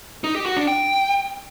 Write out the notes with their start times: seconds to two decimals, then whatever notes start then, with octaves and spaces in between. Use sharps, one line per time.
0.24 D#4
0.35 G4
0.46 F#4
0.57 D4
0.68 G5